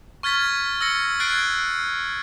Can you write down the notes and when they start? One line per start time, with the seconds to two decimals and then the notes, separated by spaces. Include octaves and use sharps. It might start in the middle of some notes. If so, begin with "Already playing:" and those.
0.23 C#6 F6 G#6 A6 B6
0.81 E6 A6 A#6 C#7
1.20 F#6 G#6 A6 C7 D7